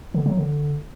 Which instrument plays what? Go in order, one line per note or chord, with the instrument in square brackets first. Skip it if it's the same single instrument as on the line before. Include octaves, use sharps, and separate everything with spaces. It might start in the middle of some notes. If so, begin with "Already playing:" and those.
[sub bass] D3
F#3
D3